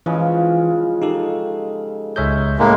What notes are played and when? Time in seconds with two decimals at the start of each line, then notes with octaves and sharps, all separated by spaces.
0.06 C#3 E3 F3 G#3
1.02 D#4 G4 A4
2.16 C#2 G#3 A#4 C#5 E5 G6
2.59 A2 G#3 A#3 C#4